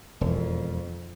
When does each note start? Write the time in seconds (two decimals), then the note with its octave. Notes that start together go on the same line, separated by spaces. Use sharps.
0.21 E1 F2